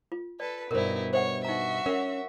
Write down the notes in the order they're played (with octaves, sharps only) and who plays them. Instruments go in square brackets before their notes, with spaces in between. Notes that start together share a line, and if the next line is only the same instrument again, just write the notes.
[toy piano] F4
[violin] A4 B4 [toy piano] D5
[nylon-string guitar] G2 B2 [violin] D#4 E4 [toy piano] A#4 C5
[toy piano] C5 E5 F#5 [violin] C#5
[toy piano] D#4 A#5 [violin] F#4 E5
[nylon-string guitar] C#4 [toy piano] A#4 F#5